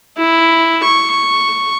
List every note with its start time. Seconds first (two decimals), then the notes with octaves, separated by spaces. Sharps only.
0.18 E4
0.85 C#6